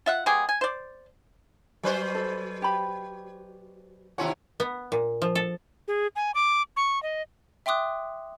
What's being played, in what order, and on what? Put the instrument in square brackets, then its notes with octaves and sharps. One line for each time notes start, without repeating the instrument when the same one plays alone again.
[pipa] F4 E5 F#5
G#3 B3 G4 G#4
G#5
C5 D5
[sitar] F#3 B4 C5
[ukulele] A4
G4 B5
[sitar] D#2 C3 C#4 [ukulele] E4 F4 F#5
[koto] B3
A#2
F3
A4
[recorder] G#4
G#5
D6
C#6
D#5
[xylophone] E5 G5 C6 D6 D#6 F#6